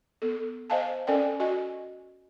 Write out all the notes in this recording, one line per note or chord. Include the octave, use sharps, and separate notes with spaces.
B3 A4
C5 D#5 F5 G#5 A5
C#4 A4 A#4 D5 G5
F#4 D#5 G#5